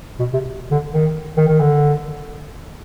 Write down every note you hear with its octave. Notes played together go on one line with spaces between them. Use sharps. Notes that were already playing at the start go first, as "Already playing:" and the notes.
B2
C3
D3
D#3
D#3
D#3
D3